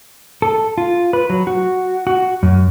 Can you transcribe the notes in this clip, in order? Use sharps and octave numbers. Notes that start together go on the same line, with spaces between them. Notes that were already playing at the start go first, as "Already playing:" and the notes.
A4
F4
B4
F#3
F#4
F#4
F#2